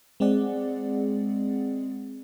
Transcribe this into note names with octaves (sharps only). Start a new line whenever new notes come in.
G#3 C4 G#4 D5 F#5